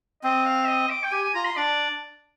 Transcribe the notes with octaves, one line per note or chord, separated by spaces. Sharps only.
C4 D#5
F5
D#5
D6
G5
G4 G#5
G#5
F4 A#5
C6
D4 D5